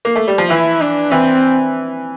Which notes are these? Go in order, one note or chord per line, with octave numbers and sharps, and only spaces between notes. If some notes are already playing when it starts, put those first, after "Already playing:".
A#3
A3
G3
F3
E3 E4
D4
E3 C4